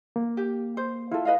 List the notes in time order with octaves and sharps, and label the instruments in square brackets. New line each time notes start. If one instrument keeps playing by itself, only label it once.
[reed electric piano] A#3
[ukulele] G4
C5
[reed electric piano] E4 [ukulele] F4 A4
[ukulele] B4 D#5 F5